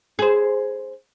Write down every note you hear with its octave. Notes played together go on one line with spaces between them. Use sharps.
G#4 C5